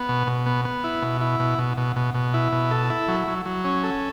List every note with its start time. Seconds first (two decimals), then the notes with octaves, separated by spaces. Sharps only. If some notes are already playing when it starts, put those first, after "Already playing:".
Already playing: B3
0.09 B2
0.27 B2
0.46 B3
0.65 B3
0.84 E4
1.02 B2
1.21 E4
1.40 B2
1.58 B2
1.77 B2
1.96 B2
2.14 B2
2.34 E4
2.52 B2
2.71 A4
2.90 E4
3.08 F#3
3.27 F#3
3.46 F#3
3.64 C#4
3.83 A4